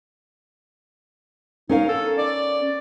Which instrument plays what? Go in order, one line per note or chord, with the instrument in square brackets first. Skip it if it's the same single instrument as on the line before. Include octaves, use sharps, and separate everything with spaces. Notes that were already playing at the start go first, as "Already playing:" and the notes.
[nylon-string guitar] C#4 A#4 F5 [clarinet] D#4
[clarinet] A4
D5